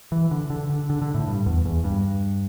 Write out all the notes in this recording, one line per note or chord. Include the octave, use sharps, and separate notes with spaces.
E3
D3
D3
D3
D3
D3
A2
G2
E2
E2
G2